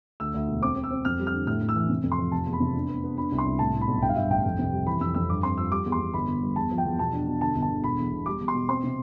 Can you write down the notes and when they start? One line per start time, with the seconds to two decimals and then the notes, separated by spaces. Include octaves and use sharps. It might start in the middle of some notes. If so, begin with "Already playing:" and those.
0.20 D2 E6
0.34 D2
0.48 E1
0.62 C4 D6
0.76 C4
0.84 E6
0.91 C4
1.05 F2 F6
1.20 G3
1.27 F6
1.33 D3
1.47 A2 F6
1.62 A2
1.69 E6
1.75 E3
1.89 C3
2.03 F2
2.12 C6
2.19 F3
2.32 F1 A5
2.46 E2
2.53 B5
2.60 C3
2.75 D4
2.89 B3
3.03 B3
3.18 D4 B5
3.32 C2
3.38 C6
3.45 C2
3.59 A2 A5
3.74 A2
3.81 B5
3.87 B1
4.02 G2 G5
4.09 F5
4.16 G2 E5
4.30 A1 G5
4.44 F2
4.59 C3
4.73 G3
4.87 E3 B5
5.00 F2 E6
5.14 F2 E6
5.30 G2 D6
5.43 C4 C6
5.57 F3 E6
5.71 G3 D6
5.86 E2
5.92 C6
6.00 E2
6.14 G1 B5
6.28 G1
6.42 G2
6.56 E2 A5
6.71 F3
6.78 G5
6.85 E2
6.99 B2 A5
7.13 D4
7.27 B2
7.41 D3 A5
7.56 G1
7.62 A5
7.69 D3
7.84 E1 B5
7.98 E2
8.13 E1
8.26 G3 D6
8.41 E2
8.48 C6
8.54 B2
8.69 C4 C6
8.83 C3